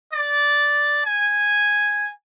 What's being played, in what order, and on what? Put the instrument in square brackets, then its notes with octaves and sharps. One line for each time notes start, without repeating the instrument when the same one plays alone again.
[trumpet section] D5
G#5